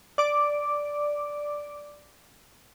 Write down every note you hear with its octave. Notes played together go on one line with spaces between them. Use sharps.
D5 D6